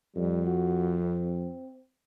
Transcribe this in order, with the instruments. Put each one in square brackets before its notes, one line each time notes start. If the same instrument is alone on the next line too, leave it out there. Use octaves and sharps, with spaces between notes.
[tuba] F2 [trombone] G3
[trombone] F#4
C4